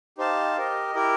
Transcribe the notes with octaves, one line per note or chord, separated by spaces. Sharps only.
D#4 G4 C5 F5 A5
G4 A#4 D#5
E4 G4 A#4